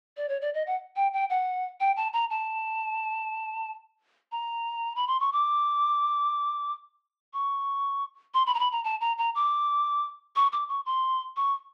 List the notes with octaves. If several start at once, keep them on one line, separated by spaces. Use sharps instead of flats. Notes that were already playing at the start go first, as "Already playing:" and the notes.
D5
C#5
D5
D#5
F#5
G5
G5
F#5
G5
A5
A#5
A5
A#5
B5
C6
C#6
D6
C#6
C6
B5
A#5
B5
A#5
A5
A#5
A#5
D6
C#6
D6
C#6
C6
C#6